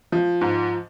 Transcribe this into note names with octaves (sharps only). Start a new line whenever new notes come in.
F3
G#2